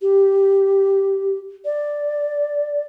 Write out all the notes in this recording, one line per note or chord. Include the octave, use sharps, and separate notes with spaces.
G4
D5